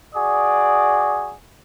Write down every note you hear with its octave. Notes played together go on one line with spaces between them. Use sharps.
F#4 G#4 D5 D#6